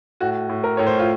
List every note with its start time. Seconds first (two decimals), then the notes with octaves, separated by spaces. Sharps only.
0.20 A2 F#4
0.49 A2
0.64 A#4
0.77 A2 C#5
0.87 C5
0.99 F4